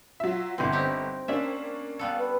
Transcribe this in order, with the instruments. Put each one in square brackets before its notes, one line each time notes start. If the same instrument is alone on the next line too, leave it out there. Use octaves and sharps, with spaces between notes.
[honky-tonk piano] F#3 E5 [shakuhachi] F4
[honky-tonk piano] G1 B3 [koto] D3 C4 [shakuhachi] E4
[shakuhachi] C4 [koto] D#4 E4 G4
[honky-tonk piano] A#3 C#4 D4 [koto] E5
[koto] G3 B3 A4 [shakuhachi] F5
[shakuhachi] B4